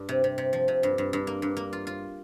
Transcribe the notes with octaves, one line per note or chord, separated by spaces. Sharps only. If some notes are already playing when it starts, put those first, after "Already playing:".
Already playing: G2
C3
C3
C3
F3
C3
G2
G2
G2
A#3
G2
A#3
F4
F4